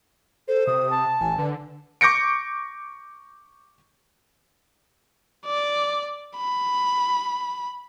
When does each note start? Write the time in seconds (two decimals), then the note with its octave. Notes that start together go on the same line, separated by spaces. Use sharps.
0.48 A4 C5
0.67 C3 D#6
0.90 A5
1.20 A1 G#5
1.38 D3 B4
2.01 C#6 D6 G6 A#6 C#7 D7
5.46 D5
6.37 B5